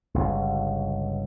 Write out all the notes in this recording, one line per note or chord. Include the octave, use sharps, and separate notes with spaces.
G1 C#2